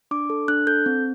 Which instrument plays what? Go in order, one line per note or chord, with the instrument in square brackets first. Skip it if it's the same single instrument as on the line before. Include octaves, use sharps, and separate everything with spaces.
[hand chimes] D4 D6
A4
D4 F#6
A4 G6
C4